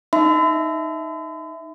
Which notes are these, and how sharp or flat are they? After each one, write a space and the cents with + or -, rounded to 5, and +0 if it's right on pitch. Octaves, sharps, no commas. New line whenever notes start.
D#4 +0 E5 +0 B5 +45